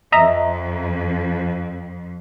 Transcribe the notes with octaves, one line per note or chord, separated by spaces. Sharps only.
F2 D#5 E5 A#5